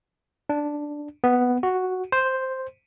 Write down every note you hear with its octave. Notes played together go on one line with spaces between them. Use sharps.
D4
B3
F#4
C5